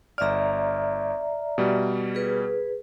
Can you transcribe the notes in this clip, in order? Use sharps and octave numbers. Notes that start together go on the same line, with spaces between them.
G1 D5 E5 A#5 F6
B2 G3
G#4 B4